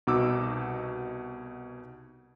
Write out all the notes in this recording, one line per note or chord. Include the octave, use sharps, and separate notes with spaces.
C2 B2 D#4 F#4 D6 E6